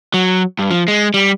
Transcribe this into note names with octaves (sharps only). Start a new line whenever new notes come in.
F#3
G2
F3
G#3
G3